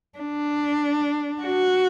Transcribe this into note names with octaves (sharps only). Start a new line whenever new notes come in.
D4
F#4